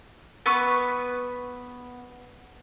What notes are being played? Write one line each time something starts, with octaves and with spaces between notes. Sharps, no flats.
B3 B4 C#6 E6